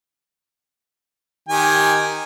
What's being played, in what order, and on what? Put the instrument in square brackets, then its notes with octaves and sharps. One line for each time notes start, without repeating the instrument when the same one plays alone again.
[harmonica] D#3 G4 G#5